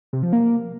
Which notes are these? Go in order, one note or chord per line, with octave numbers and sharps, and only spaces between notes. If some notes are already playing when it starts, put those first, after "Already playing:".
C3
F3
A#3